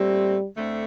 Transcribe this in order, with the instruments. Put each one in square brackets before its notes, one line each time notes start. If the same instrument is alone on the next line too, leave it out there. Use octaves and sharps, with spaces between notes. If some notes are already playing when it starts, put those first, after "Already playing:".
Already playing: [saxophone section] A#2 A3 C4 [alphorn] G3
[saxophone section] D2 D3 A3 C4